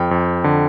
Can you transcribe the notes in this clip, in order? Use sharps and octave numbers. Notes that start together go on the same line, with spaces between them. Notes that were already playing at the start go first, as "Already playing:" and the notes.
Already playing: F2 G5
F2
D3